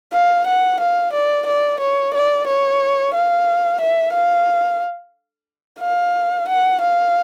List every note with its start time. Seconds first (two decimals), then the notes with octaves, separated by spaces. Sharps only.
0.13 F5
0.47 F#5
0.80 F5
1.13 D5
1.47 D5
1.80 C#5
2.14 D5
2.47 C#5
3.14 F5
3.81 E5
4.13 F5
5.80 F5
6.48 F#5
6.81 F5